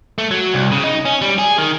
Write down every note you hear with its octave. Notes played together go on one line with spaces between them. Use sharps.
A3
F#3
C2
C#3
D#4
C#4
G3
G#4
D#3